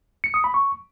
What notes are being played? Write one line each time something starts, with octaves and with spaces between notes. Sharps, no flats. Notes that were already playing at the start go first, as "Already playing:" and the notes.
C#7
D#6
B5
C#6